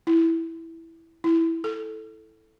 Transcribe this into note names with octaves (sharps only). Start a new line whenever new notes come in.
E4
E4
A4